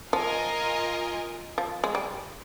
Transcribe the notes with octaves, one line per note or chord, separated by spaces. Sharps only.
F3 F4 A#4 D#5 G#5
F3
G#3
G3